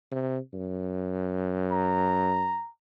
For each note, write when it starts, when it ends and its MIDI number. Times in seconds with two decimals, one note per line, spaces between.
0.11 0.38 48
0.53 2.60 42
1.72 2.70 82